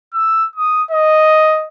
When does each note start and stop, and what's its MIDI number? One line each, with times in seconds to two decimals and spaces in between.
0.14 0.46 88
0.56 0.83 87
0.91 1.67 75